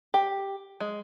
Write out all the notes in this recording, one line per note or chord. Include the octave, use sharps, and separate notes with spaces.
G4
G#3